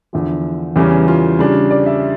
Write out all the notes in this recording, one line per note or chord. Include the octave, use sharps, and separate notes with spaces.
E2 D3 F3 E4
E2 C#3 E3 G3 C#4
F4
C#3 G3 D4
D5
E5